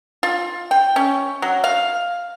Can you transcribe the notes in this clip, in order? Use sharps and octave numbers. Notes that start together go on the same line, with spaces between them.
F4
G5
C#4
F#3
F5